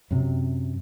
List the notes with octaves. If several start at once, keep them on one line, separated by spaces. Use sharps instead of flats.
F#2 C3